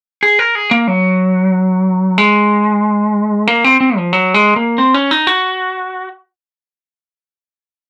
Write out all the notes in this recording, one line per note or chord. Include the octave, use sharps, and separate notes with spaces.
G#4
A#4
G#4
A#3
F#3
G#3
A#3
C4
C4
F3
F#3
G#3
A#3
C4
C#4
D#4
F#4